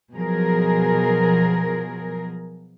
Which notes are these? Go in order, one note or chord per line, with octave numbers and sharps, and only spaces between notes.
B2 F3 F#3 G#4 A#4